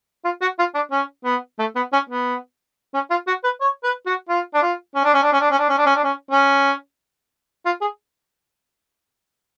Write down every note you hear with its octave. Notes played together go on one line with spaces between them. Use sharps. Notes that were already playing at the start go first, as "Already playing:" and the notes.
F4
F#4
F4
D4
C#4
B3
A3
B3
C#4
B3
C#4
F4
F#4
B4
C#5
B4
F#4
F4
D4
F4
C#4
D4
C#4
D4
C#4
D4
C#4
D4
C#4
D4
C#4
D4
C#4
C#4
F4
G#4